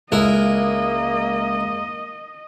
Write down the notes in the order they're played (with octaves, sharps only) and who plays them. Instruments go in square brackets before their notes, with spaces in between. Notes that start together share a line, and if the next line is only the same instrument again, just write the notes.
[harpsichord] C#2 E4 A#4 [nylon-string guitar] G#3 [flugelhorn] A#3 [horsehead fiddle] D#5